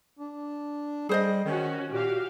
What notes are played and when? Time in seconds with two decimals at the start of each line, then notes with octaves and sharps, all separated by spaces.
0.19 D4
1.09 G3 G#4 C5 D#5
1.45 D#3 C#4 F#4
1.92 A#2 F#4 G4 F5